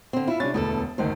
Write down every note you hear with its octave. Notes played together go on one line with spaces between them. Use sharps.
D3 C4
E4 F4 E5
C3 C#4 D4 A6
E1 D2 B3 G#4 A4
F#1 D2 D#3 C5